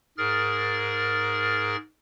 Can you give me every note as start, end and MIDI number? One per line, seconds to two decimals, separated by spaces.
0.18 1.76 44
0.18 1.76 68
0.18 1.76 70
0.18 1.76 89
0.18 1.76 93